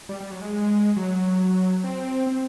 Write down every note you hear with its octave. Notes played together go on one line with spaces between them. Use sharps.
G3
G3
F#3
G#3
F#3
C4
C4